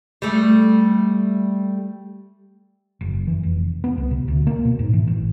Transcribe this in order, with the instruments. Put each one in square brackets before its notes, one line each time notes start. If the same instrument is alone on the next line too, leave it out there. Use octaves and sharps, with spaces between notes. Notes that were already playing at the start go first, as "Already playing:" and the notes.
[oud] G3 A3
[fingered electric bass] F#1
E3
F1
B3
C2
C3
D2
A#3
B2
G#2
E3
A1